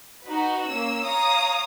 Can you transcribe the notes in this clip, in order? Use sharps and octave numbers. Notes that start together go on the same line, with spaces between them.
D#4 F#4 B4
A#3 C#4 E6
C#5 F5 A#5 D#6